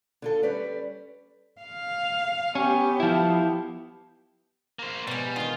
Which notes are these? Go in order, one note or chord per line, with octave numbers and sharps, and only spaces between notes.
D3 F4 A4
G3 C#4 B4 D5
F5
B3 C#4 G4
F3 E4
A#3 C5
B2 G3 G#3
D#3 D#4 F4